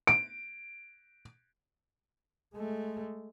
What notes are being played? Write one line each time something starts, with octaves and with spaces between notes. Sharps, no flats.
D7
G#3 A3